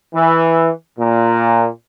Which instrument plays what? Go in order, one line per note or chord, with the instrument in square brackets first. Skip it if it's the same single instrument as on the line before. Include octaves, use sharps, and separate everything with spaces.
[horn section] E3
A#2